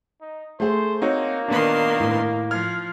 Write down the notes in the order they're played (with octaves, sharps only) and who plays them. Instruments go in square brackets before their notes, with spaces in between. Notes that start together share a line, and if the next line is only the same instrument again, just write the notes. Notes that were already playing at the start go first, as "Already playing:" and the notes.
[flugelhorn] D#4
[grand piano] A3 G#4 [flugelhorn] C5
[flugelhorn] A#3 [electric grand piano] C4 D#4 F#4 [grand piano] C#5
[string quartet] A#2 D#3 C6 [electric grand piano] B3 D4
[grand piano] A2
[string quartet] F3 [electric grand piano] F6 G#6